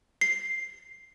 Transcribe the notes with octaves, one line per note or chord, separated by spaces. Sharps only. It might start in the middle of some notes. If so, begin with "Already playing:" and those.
C7